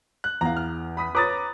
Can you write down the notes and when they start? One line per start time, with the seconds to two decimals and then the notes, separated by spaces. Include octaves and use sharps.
0.24 F#6
0.41 E2 F5 A#5
0.57 F6
0.97 B5 D#6 B6
1.15 B4 C#5 A#5 D6 D#6 A6